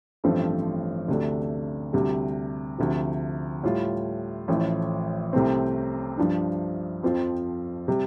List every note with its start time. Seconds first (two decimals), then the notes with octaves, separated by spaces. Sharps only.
0.24 A1 G2 F3 A3 C4
1.08 D2 C3 A3 D4
1.93 D2 C3 G3
2.78 D2 C3 F3
3.63 A2 G3 F4
4.48 A1 A2 F3
5.33 C2 C3 A3 C4
6.18 G2 F3 D4
7.03 F2 F3 C4 F4
7.88 C3 G3